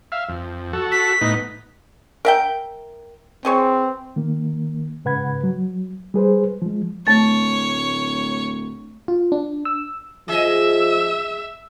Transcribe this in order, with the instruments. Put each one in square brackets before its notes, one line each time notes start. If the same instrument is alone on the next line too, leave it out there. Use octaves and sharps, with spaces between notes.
[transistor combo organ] E5 F5
F2
F#4 A4
[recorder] B6
[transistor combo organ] A2 B3 D#4
[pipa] A#4 E5 G5
[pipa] E3 G#4 C#5 [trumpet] C4
[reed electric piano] D#3 A#3
G#2 C#3 B4 F#5 B5 G#6
F#3
G3 G#4 B4 C5
F3 G#3
[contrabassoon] D1 [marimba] A3 A6 [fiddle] C#5
[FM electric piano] F4
D4
E6
[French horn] F3 [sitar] G#4 D#5 [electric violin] E5